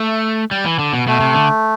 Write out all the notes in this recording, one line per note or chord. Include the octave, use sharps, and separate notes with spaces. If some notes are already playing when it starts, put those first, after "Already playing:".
Already playing: A3
G3
E3
D3
B2
B2 A3
C3
D3